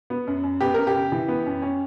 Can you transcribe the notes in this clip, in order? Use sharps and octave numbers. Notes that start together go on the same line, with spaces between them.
B3
F#2
F#2
B3 G4
F#2 A#4
G4
C#3
E3
B3
F#2
C#4